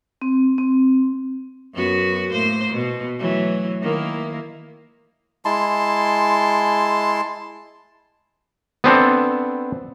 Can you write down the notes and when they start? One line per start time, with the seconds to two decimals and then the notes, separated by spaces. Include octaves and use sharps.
0.22 C4
0.58 C4
1.74 F#2 B3 F#4
2.32 A2 A#3 C5
2.72 B2
3.19 E3 F#3 A3
3.81 D#3 A#3 E4
5.45 G#3 E4 A5 C6
8.84 B3 C4 D4 A4